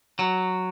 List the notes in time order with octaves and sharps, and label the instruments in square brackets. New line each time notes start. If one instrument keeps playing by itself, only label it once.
[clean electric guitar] F#3